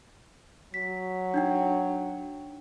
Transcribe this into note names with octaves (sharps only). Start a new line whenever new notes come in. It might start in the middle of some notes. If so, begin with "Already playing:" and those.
F#3 B6
D4 D#4 G5